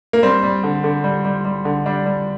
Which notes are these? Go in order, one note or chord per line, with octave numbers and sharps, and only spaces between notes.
A#3
G3 C4
G3
D3
D3
G3
G3
G3
D3
G3 D4
G3